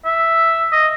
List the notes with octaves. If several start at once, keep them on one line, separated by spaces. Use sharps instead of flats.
E5
D#5